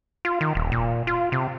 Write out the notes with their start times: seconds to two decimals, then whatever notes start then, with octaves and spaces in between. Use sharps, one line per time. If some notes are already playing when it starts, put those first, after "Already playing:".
0.25 F4
0.41 D#3
0.55 D#1
0.72 A#2
1.07 F4
1.32 C3